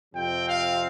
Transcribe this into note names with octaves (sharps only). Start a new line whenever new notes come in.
F2 C3 F3 C4 G5
F5